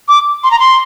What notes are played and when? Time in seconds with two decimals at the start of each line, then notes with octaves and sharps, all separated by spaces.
0.08 D6
0.44 C6
0.51 A#5
0.59 C6